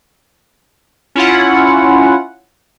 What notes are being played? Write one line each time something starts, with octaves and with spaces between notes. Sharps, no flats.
C#4 E4 F4 F#5